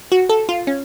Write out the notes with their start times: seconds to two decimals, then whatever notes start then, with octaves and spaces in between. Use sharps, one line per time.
0.12 F#4
0.29 A4
0.49 F4
0.67 C#4